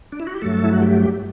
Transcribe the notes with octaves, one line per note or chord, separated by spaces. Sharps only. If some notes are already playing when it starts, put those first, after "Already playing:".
D4
E4
F#4
G4
G2 F#3 A3 A4
E4
F#4
G4